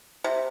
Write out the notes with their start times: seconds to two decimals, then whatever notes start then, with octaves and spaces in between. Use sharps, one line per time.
0.24 C3